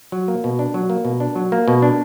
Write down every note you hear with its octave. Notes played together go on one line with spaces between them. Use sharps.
F#3
A#3
B2
D4
F#3
A#3
B2
D4
F#3
A#3
B2
D4